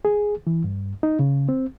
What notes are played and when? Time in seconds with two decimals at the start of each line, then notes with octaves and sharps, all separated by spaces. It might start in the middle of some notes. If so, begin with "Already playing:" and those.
0.05 G#4
0.47 E3
0.64 G2
1.03 D#4
1.19 C#3
1.49 C4